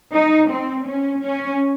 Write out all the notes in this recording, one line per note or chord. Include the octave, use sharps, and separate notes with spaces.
D#4
C4
C#4
C#4